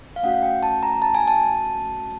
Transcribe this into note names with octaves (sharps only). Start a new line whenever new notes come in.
F5
A3 C#4 F#4 F#5
G5
A5
A#5
A5
G#5
A5